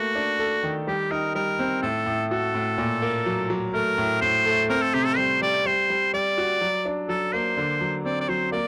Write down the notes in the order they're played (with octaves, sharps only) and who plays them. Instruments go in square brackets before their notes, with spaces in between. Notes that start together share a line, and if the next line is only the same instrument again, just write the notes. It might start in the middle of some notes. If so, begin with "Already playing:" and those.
Already playing: [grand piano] A3 A#3 [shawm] F#4
[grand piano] D4
A4
D#3
[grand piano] G3 [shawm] G4
[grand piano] D#4 [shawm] A#4
[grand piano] G3 [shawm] A#4
[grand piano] C4
[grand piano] A2 [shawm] A4
[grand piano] A2
[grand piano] F#4 [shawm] A4
[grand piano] A2
A#2
A#3
F#3
F#3
[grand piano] A3 [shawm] A#4
[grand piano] A2
[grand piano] A2 [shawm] C5
[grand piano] A3
[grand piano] C4 [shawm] A#4
[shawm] A4
[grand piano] C3 [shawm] G4
[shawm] A4
[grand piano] G3 [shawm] C5
[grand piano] G3 [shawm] D5
[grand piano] G3 [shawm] C5
[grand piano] G3
[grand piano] G3 [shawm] D5
[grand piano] F#4
F#3
D4
[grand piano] F#3 [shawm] A4
[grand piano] A#3 [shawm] C5
[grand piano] D3
F#3
[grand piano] C4 [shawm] D5
[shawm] D5
[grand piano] F#3 [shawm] C5
[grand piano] A#3 [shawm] D5